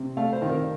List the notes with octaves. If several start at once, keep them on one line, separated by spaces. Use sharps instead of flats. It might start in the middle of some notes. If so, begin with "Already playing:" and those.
Already playing: C3
A3 F5
C5
D#3
A#4